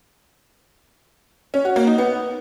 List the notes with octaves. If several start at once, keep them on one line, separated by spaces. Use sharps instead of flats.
C#4
F#4
A#3
D#4
B3